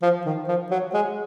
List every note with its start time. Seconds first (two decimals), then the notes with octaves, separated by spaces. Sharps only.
0.02 F3
0.26 D#3
0.48 F3
0.71 F#3
0.94 G#3